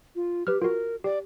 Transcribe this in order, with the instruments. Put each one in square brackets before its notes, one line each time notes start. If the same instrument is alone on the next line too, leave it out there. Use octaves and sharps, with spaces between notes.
[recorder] F4
[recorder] G4 [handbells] B4 F6
[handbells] F4 F#4 [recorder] A#4
[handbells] G4 [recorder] D5